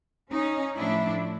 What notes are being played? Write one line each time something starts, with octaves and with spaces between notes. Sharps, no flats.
C#4 D#4
A2 F3 A3 D4 E4